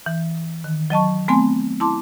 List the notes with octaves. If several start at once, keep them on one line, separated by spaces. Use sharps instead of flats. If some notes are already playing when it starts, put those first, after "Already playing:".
E3
D#3
F#3 D#5 A5 C#6
A3 B3 C4 G#5 C6
E4 A5 C6 D6